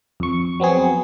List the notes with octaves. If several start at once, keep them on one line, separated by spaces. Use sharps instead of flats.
F2 C#6
F#3 B3 C4 G#4